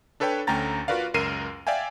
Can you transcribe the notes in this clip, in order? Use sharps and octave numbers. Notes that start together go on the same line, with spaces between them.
D4 A4 B4 C#5 G5
D2 A3 C#4 G5 A#5 A6
F4 F#4 A#4 B4 D5 F5
C#2 F#2 A#4 C7 D#7 E7
D5 E5 F5 G5 G#5